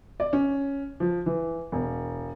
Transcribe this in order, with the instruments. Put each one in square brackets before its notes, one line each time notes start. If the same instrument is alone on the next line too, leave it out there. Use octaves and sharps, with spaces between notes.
[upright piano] D5
C#4
F3
E3
E1